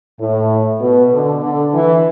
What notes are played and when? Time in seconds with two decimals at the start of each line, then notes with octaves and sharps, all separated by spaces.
0.19 A2
0.81 B2
1.12 D3
1.43 D3
1.75 E3